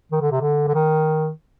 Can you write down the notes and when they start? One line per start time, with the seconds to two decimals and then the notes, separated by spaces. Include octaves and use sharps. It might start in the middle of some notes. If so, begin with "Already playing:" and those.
0.12 D#3
0.21 D3
0.32 C3
0.41 D3
0.68 D3
0.74 D#3